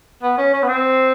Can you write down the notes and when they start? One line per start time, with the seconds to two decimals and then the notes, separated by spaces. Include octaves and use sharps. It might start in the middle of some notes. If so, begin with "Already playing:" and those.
0.22 B3
0.38 C#4
0.54 C#4
0.63 B3
0.68 C4